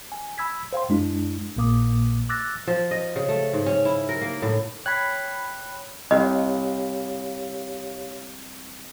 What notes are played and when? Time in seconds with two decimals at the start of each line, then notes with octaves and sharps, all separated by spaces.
0.12 G#5
0.38 B5 E6 G#6 B6
0.73 C5 F5 G5 C6
0.89 F#2 G#3 D4 E4
1.56 A#1 A#2 A#3 D6 D#6
2.29 D6 E6 F#6 A6 A#6
2.67 F3
2.91 D#5
3.16 C#3
3.29 A3
3.53 G#2
3.66 C#4
3.85 E4
4.09 A#4
4.21 A#3
4.42 A2
4.86 C#5 G5 B5 F#6 G#6 B6
6.11 C2 G4 C#5 D#5 F5